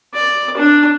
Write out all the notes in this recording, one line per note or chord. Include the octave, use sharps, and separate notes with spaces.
D5
D4